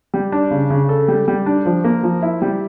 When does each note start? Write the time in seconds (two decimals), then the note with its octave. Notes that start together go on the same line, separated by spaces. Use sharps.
0.14 G3
0.32 D4
0.51 C#3
0.70 C#3
0.89 A4
1.08 G3
1.28 G3
1.46 D4
1.66 F3
1.84 A#3
2.03 F3
2.22 E4
2.42 G3